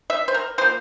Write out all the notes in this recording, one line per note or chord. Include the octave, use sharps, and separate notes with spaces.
E5
C5
A#4
F3 A#3 C5